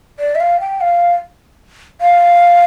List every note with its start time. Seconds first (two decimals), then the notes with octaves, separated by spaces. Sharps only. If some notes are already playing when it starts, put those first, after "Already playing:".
0.19 D5
0.35 E5
0.40 F5
0.60 G5
0.81 F5
2.01 F5